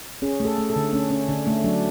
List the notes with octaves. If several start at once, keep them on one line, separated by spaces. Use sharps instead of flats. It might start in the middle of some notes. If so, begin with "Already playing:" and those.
C#4 G#4
A3
A4
A3
A4
D3
A3 C#4
C#4
D3 D4
A3
F#3 D4